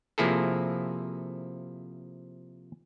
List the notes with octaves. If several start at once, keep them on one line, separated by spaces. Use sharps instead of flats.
C3 F3 A#3 E4 G#4 A4